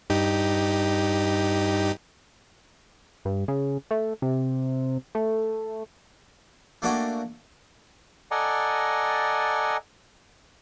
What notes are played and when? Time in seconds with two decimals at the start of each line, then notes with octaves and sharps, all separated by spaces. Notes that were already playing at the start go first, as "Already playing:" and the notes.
0.10 G2 D#4 G4
3.25 G2
3.48 C#3
3.91 A3
4.22 C3
5.15 A3
6.82 A3 A#3 D4 F#4 D5 G#5
8.31 A4 D5 D#5 F#5 G#5 A#5